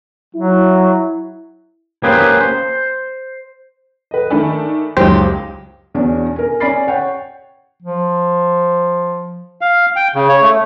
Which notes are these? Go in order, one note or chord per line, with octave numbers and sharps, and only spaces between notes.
F#3 E4
A#3 C#4 G4 G#4 B4 C5
C5
B4 D#5
D#3 A3 D4 G#5 B5
F#1 C#2 F#3 D#4 G4 C5
E2 B2 C#4 D4
A#4 G#5
C#4 D5 G#5 B5 A6 C7
C#5 F#5 G5
F3
F5
G5
C#3
C#5
A3